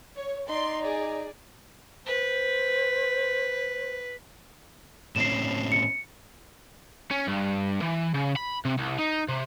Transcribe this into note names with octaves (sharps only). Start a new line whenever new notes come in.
C#5
D#4 D5 C6
G#4 D5
B4 C5
A2 C4 C#4 C7 E7
C#7
C#4
G2
E3
C#3
B5
C3
C2
D#4
C3